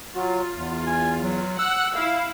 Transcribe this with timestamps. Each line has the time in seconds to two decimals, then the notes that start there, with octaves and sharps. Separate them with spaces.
0.14 F#3 F4
0.55 E2
0.87 G#5
1.23 F#3
1.59 F#5 E6
1.95 E4 F5